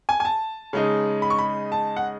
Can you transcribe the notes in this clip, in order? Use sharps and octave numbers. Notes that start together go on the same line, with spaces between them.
G#5
G#5
A5
C#3 G#3 D#4
B5
C#6
B5
A5
F#5